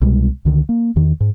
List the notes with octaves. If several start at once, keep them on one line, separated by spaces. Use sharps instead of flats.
C2 B2 G3 G#3
C#2 D3 D#3
A#3
E2 D#3
G#2